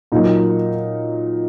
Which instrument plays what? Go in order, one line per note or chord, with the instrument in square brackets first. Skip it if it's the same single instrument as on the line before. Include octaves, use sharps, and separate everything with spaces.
[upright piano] A#2 F#3 A#3 D#4